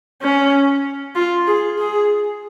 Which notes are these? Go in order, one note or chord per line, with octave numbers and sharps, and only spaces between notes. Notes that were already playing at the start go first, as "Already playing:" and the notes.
C#4
F4
G#4
G#4